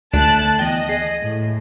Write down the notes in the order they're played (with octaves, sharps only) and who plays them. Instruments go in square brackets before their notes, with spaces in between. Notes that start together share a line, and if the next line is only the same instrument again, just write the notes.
[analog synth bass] D2 [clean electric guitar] D3 A3 D4 [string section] A5 F#6
[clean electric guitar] E2 G5 [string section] D#5
[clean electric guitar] G#4
[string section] A2